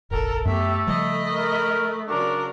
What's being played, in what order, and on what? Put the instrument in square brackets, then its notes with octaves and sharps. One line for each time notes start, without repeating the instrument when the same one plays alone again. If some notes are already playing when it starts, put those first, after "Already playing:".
[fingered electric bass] F1 A#1 [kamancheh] A4 A#4
[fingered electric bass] F#2 B3 [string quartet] A3 [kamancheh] G4 E5 [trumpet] A4
[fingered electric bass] C#3 F3 G3 [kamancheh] D#5 B5
[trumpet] A#4
[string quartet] C#3 F#3 D5 [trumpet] D4 [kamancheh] A#4